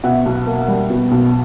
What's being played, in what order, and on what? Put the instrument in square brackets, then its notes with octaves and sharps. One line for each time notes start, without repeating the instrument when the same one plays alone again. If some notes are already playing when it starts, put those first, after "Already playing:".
[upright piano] B2 E5 F#5
B1
A#3
G3
B2
B1